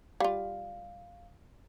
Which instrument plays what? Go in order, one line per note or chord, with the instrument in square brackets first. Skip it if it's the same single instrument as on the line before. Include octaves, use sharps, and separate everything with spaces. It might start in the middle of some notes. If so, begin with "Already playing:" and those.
[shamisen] G3 F4 [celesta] F5